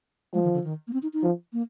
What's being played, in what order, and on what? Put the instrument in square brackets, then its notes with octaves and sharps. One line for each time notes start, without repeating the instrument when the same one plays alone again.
[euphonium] F3 [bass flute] G#3
[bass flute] D#3
D3
D#3
A#3
C4
D#4
D#4
[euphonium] F3
[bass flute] A#3